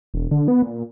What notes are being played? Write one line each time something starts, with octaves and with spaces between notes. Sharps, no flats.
E1
D3
B3
A#2